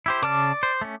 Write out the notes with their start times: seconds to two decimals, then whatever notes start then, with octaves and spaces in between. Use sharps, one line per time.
0.06 E4 G4 C5
0.22 C#3 D5 A5 F6
0.63 C5
0.81 A3 C#4